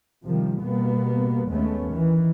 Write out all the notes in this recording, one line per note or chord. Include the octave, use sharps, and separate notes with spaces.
C3 D#3 F3 G3
B2 G3 A#3 B3
D#2 G#3 A3 B3 C#4
D#3 E3